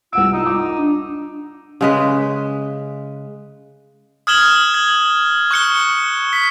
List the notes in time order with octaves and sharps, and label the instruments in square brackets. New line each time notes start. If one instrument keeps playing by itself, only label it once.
[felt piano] C2 F#5 D7 [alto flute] F4 [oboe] E6
[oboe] D#4
[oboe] D#4 [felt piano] D6
[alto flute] D4
[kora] C#3 G#3 B4
[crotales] D#6 F6 G#6 E7 F#7 G7
G#6
C#6 F#6 C#7 G7
B6